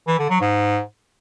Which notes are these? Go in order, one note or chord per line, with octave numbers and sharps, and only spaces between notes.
E3
D3
F#3
G#2